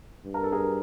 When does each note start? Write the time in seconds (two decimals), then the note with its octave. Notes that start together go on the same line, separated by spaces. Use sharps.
0.24 G2
0.34 A#4
0.43 A4
0.52 G#4 A#4